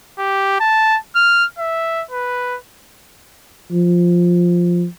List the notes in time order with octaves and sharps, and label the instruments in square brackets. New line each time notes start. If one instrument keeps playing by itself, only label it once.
[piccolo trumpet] G4
A5
F6
E5
B4
[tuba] F3